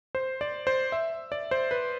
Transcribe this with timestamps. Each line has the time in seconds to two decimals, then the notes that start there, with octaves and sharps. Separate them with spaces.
0.15 C5
0.41 D5
0.67 C5
0.92 E5
1.32 D5
1.51 C5
1.71 B4